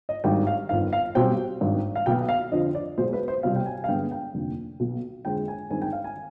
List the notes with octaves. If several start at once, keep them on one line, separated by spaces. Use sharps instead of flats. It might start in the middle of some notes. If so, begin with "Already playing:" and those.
D#5
G#1 G2 D#3 G3 G5
F5
G1 F2 D#3 F5
F5
B1 B2 G3 C4 G5
G#1 G2 D#3
F5
B1 B2 B3 G5
F5
F2 D3 F3 D#5
D5
B1 B2 G#3 C5
B4
C5
C2 B2 G3 C4 F5
G5
G#5
F5
G2 D3 G#3 B3 G5
G5
F1 D#2 D3
B1 B2 B3
F2 D3 G#3 C4 G5
G#5
G2 D#3 G#3 C4 G#5
G5
F5
G#5